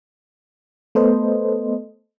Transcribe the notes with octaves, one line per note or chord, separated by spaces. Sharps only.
A3 B3 A4 B4 C5 D#5